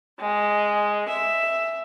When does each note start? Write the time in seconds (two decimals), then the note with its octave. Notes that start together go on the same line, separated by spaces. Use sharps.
0.20 G#3
1.10 E5